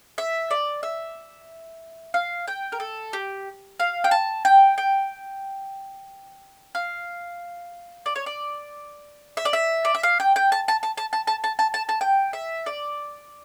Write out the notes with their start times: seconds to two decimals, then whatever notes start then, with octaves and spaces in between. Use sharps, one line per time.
0.18 E5
0.51 D5
0.83 E5
2.14 F5
2.48 G5
2.72 A#4
2.80 A4
3.13 G4
3.80 F5
4.04 G5
4.11 A5
4.45 G5
4.78 G5
6.75 F5
8.06 D5
8.16 C#5
8.26 D5
9.37 E5
9.45 D5
9.53 E5
9.85 D5
9.95 E5
10.03 F5
10.20 G5
10.36 G5
10.52 A5
10.68 A5
10.83 A5
10.97 A5
11.13 A5
11.27 A5
11.44 A5
11.59 A5
11.74 A5
11.89 A5
12.01 G5
12.33 E5
12.66 D5